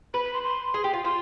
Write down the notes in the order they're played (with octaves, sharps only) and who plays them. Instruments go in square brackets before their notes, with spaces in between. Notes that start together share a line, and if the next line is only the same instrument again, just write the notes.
[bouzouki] B4 [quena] B5
[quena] B5
C6
C6
[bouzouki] G#4
G4
F4
[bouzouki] F4 [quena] C6